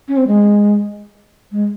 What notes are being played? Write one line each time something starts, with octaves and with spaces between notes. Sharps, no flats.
C#4
C4
G#3
G#3